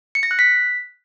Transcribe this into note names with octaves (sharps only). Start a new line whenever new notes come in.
C#7
A#6
F#6
B6